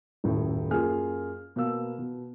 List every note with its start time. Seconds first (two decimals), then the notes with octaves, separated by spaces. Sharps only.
0.24 D#1 F#2 A2
0.71 F#2 A#3 F4 G#4 F6
1.56 B2 A#3 F5 E6
1.98 B2